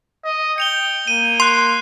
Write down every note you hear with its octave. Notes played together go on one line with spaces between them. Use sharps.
D#5
G5 C#7 F7 G7
A#3 D#7
C6 F#6 C7